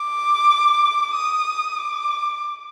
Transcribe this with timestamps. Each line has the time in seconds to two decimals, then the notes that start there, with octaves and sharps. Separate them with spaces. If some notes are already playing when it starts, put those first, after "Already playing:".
Already playing: D6
1.14 D#6
1.79 D6